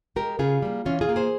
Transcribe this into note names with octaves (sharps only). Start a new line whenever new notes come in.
G#3 G4 A#4
C#3 F4 G#4
G3 A#3
E3 C#4 F4
F4 G#4
A#3
G#4 C5